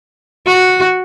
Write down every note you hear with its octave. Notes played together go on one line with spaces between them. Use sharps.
F#4